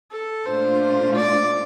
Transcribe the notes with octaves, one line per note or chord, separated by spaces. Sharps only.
A4
A#2 A3 D4 F4 C5
D5